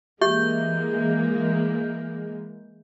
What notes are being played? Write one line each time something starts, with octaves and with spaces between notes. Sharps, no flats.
E3 G#3 A#3 G4 E5 G6